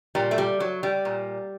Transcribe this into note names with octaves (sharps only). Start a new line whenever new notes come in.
A#2 G3
A3
G3
F#3
G3
A#2